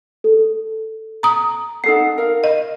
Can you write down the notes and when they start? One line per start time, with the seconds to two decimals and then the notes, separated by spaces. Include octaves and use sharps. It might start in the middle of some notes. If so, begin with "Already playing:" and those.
0.24 A4
1.23 A#5 D#6
1.84 D#4 A4 F#5 C7
2.18 A#4 F5
2.44 D#5